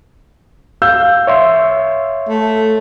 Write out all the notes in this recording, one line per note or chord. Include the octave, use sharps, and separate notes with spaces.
F5 E6 G6
C#5 E5 C6
A3